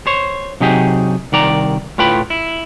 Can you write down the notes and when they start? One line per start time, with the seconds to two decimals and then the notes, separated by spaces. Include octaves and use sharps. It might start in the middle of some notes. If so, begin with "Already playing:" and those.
0.07 C5 C#5
0.60 C3 F#3 D#4 G4 G#4
1.32 C2 D#3 D5 A#5
1.98 A2 F4 B4 G5 B5
2.30 E4